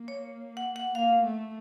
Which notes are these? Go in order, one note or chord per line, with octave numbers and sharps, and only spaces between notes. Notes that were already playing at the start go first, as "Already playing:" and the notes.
Already playing: A#3
C#5
F#5
F#5
A#3 F5
A3